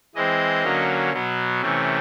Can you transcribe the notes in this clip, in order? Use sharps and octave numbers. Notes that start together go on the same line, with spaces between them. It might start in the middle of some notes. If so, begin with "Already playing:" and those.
E3 G#3 C4 D#5
D3 F#3 A#3 C#4
B2 F#3 B3
C3 E3 A3 C#4